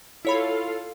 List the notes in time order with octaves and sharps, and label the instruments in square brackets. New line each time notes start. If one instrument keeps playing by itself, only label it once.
[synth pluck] E4 C#5 B5 [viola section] F4 A4 F5